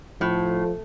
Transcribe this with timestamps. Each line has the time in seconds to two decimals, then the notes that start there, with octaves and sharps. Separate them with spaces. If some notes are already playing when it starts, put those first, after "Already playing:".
0.21 A2 F3